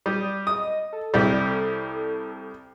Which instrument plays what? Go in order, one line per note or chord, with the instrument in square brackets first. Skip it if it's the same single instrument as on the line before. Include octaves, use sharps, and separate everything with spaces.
[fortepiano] G3 [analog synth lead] D#6
[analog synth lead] D#5 [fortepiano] D#6
[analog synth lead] A4
[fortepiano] C2 G3